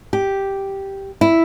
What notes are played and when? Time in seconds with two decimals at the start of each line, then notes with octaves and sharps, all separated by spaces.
0.13 G4
1.21 E4